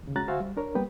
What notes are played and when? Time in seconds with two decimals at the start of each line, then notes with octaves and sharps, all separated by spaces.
0.03 D#2 C#3
0.16 G#3 C#4 F#4 A#5 F#6 A6
0.28 D2 F#4 C5 E5 F5 G#5
0.40 G3
0.57 D4 A#4 C#5
0.75 G3 A#3 B3 B4 G5